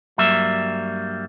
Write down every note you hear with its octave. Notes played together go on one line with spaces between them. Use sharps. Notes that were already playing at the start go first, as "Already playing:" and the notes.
G2 F#3 G3 A#3 E5